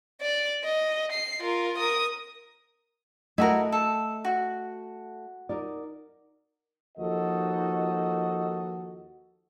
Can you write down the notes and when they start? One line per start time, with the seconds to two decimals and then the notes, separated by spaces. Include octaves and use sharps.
0.22 D5
0.64 D#5
1.12 C7
1.41 F4 A#4
1.78 A#4 D#6
3.38 A3 E4 F#4 A#4 D#5
3.72 A4
4.25 F#4
5.49 D#4 A#4 D5
6.98 D#2 F3 D#4 F#4 A4 D#5